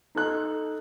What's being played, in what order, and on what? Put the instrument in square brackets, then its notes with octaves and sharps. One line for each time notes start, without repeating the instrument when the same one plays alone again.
[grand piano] D#4 A4 F#6